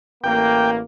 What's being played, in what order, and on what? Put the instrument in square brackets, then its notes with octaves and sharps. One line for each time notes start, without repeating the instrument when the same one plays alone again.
[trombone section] A1 A#3 [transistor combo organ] G5